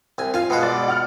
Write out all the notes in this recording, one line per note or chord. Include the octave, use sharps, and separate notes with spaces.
C2 G#5
F4 F5 G#5
B2 G#3 F#4
D5
F#5 F6